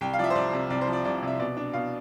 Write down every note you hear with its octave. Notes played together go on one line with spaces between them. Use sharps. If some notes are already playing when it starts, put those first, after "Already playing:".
C2 G5
F5
F3 D5
E5
C5
C2 D5
C3
C2 D5
C5
F3
D5
C2 D5
C3 E5
B2 D5
D4
B2 F5